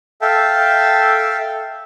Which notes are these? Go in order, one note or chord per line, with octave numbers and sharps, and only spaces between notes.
A4 E5 F5 G5 A5